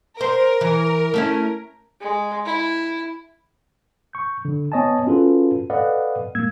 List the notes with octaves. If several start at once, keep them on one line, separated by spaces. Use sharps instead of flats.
A#4 C5
E3
A3 C#4 E4
G#3
E4
C#6 G6
D3
B3 C#5 D#5 G#5 A5
C#4 F4 F#4 G#4 A4 B4
A4 B4 D5 D#5 F5 F#5
A#2 G#3 A#3 E6 G#6